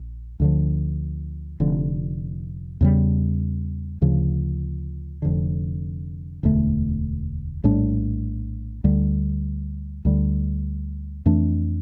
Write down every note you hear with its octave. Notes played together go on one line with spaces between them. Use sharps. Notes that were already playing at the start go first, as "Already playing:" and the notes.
Already playing: A#1
D2 D3 F3
F1 F2 D3
E2 C#3 G3
D2 C#3 F3
F1 F2 D3
E1 D2 D3 A3
A#1 A2 G3 D4
D2 D3 G3
D2 D3 G3
F2 E3 A3 D4